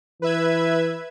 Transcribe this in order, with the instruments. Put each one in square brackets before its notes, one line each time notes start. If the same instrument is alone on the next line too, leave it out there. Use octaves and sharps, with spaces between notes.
[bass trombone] E3 [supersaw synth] B4 E5 G#6